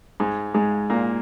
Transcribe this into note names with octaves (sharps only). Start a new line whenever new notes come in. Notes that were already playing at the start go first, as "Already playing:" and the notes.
G#2 G#3
G#2 G#3
A#2 A#3